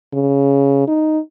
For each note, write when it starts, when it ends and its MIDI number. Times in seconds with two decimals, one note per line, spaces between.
0.13 0.83 49
0.88 1.19 63